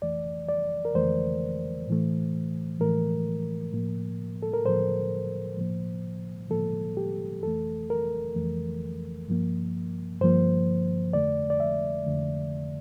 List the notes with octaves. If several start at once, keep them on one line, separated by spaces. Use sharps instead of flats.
F2 E3 A3 D5
D5
A#4
F2 E3 A3 C5
A2 E3 A3
A2 E3 A3 A#4
A2 F3 A#3
A4
A#4
A2 F3 A#3 C5
A2 F3 A#3
A2 F3 A#3 A4
G4
F2 E3 A3 A4
A#4
F2 E3 A3
G2 F3 A#3
G2 F3 A#3 C5
F2 D3 A3 D5
D5
E5
F2 D3 A3